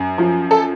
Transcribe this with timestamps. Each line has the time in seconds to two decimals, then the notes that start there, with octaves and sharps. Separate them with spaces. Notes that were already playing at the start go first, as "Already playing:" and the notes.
Already playing: F#2
0.18 F3
0.51 A4